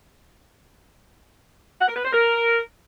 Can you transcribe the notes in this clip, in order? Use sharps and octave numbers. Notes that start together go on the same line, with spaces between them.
F#5
A#4
B4
C5
A#4